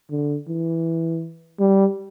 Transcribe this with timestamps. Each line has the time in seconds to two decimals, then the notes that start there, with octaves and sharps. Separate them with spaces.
0.11 D3
0.48 E3
1.59 G3